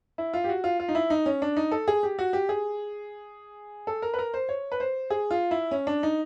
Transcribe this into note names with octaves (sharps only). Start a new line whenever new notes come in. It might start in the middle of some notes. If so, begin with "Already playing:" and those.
E4
F4
G4
F#4
F4
F4
D#4
E4
D#4
C#4
D4
D#4
A4
G#4
G4
F#4
G4
G#4
A4
A#4
B4
A#4
C5
C#5
B4
C5
G#4
F4
E4
C#4
D4
D#4